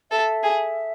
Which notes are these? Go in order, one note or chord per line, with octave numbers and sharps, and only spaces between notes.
A4 E5
G#4